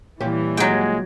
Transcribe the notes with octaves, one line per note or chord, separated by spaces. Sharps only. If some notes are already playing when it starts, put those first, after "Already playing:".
A#2 E3 G3 C#4 G4
F#3 G#3 G5